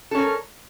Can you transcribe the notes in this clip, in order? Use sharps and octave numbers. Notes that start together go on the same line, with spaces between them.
C#4 A4 A#4